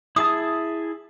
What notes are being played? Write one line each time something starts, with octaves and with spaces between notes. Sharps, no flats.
E4 G#4 A5 D#6